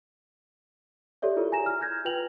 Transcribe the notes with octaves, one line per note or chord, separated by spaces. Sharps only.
G4 A4 C#5 D5 E5
E4 F4 G#4 A#4
G#5 A#5 A#6 E7
F6
F6 G6 G#6 A#6
F4 B4 G5 F7 F#7